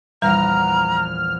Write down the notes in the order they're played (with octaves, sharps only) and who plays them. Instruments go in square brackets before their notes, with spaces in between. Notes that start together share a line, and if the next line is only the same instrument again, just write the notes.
[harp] A#1 E2 F#5 [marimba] G3 [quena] A#5 [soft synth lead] F6